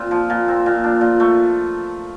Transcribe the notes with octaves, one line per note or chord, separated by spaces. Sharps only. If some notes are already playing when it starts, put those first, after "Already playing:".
Already playing: A#2 C4
F3
A#2
C4
A#2
D4
A#2
A3